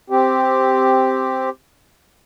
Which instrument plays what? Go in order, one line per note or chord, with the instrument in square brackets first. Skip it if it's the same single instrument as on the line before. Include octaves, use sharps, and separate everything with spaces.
[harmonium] C4 G4